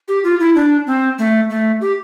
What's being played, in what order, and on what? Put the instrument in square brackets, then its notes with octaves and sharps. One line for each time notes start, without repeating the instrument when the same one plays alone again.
[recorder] G4
F4
E4
D4
C4
A3
A3
G4